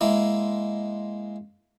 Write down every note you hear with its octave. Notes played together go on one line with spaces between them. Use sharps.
G#3 A#3 E4